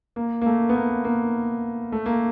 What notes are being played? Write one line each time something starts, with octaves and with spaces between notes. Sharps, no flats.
A#3
A#3
A3
B3
A#3
A#3
A3
A#3